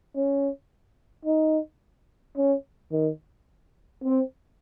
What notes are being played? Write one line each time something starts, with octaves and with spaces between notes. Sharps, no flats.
C#4
D#4
C#4
D#3
C4